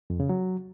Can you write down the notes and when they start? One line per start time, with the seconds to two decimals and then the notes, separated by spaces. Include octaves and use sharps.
0.10 F2
0.20 C#3
0.29 F#3